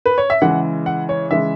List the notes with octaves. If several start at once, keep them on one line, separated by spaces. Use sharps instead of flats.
B4
C#5
E5
C#3 E3 G#3 F#5
F#5
C#5
C#3 E3 G#3 E5